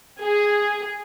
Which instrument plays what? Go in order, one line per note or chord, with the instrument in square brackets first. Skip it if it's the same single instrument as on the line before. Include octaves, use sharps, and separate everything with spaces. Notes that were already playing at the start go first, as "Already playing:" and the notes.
[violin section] G#4